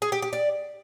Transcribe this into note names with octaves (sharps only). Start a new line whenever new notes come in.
G#4
G4
G4
D5